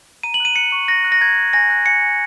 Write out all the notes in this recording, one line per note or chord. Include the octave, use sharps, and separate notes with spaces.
A#5 D#7
F#7
F#6 D#7
F#6 C#7
C#6
F#6 A#6
F#6
A#6
A#5 G#6
F#6
G#5 A#6
F#6
G#5 C#7
G#5